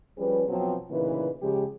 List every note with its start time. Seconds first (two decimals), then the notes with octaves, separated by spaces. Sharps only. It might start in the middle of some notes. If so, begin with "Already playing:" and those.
0.17 F3 G3 C#4 G#4 B4
0.48 B2 F3 F#3 C4
0.89 D2 A#2 C#3 E3 D#4 B4
1.41 C#3 F3 G#3 G4